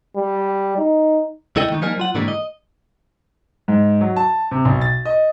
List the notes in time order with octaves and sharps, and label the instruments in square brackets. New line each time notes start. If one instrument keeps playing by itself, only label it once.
[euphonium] G3
D#4
[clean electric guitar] C2 E4 A4 D#5 G5
D#3 A3 D#4
F3 G3 A#3 D#4 A#4 G#5
F#3 F4 F#5
G#2 D3 E3 G3 A3 A#3
D#5
[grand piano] G#2
F#3
A5
C3
B1
A6
D#5